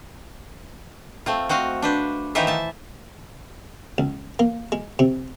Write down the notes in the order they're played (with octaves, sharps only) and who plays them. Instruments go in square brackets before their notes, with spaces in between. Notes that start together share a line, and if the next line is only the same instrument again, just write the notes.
[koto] A3 C4 F4
C4 F#4 D#5 F5
D4 B4 C5
D#3 E3 D#4 F4 C5 E5
E5 A5
[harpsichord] C#2
A#3
G#3
C3